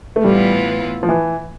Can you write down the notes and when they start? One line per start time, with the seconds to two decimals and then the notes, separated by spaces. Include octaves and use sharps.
0.16 A3
0.24 A2 E3 G3 B3 F4
1.03 F3
1.09 E3